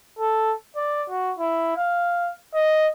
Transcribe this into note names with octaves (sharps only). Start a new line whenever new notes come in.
A4
D5
F#4
E4
F5
D#5